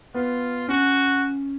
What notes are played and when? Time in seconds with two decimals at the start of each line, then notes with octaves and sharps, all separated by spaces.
0.14 B3 F4
0.68 C#4 F#4